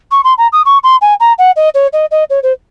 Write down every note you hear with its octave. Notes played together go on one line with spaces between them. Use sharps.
C#6
C6
A#5
D#6
C#6
C6
G#5
A#5
F#5
D#5
C#5
D#5
D#5
C#5
C5